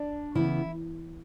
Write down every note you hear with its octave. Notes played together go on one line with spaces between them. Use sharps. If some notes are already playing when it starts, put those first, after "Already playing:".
Already playing: D4
C#3 E3 B3 E4